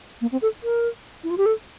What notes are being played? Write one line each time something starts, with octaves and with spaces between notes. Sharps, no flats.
A#3
C4
A4
A#4
E4
F4
G4
A4